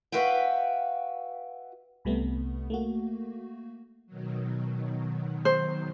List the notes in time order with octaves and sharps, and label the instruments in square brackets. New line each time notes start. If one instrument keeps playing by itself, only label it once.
[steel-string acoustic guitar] F#4 B4 E5 F5 G5
[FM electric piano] C2 C3 G3 A3 B3
A3 A#3 F#4
[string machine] B2 D#3 F#3
[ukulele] C5